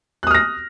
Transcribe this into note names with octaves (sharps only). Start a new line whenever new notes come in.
D#6 F6 F#6 A#6